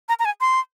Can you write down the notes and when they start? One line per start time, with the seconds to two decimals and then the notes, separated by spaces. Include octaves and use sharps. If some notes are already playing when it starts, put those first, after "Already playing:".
0.09 A#5
0.19 A#5
0.25 G#5
0.41 C6